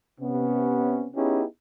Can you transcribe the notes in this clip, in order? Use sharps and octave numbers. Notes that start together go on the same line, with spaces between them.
C3 B3 C#4
B3 C#4 D#4 E4 G4 G#4